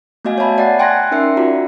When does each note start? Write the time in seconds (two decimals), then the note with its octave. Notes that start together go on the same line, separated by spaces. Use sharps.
0.25 A3 B3 F#4 D#5 F5 G#5
0.38 C#5 E5 G#5 A5 B5
0.58 D5 F#5 A5 A6 C7
0.79 G5 G#5 C6 F#6 G#6 A#6
1.11 C#4 D#4 A#4 E5 C7 C#7
1.37 F4 F#4 D5 A#5